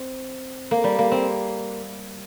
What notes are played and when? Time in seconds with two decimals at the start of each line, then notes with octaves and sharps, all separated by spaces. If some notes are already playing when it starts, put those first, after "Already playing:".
Already playing: C4
0.71 A#3
0.84 G3
0.99 A#3
1.12 C4